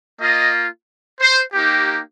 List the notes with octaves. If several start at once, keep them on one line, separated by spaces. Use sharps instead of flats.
A#3 F4 D#5
C5
A#3 D#4 G4